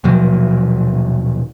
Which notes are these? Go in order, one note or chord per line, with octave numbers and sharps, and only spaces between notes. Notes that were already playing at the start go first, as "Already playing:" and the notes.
D#1 B2 F3 F#3